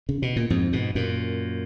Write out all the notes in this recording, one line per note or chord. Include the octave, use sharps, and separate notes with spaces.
C#3
B2
A#2
F2 G#2
G#2 B2
F#2 A#2